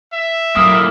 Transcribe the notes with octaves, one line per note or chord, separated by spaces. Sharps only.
E5
A2 F#3 A#3 D#6